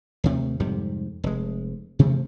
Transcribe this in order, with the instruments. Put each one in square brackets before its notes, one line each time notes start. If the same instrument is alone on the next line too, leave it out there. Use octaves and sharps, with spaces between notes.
[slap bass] D#2 C3 A3
F2 G#2 C3 G3
F1 G#3
C3 E3 F3 A3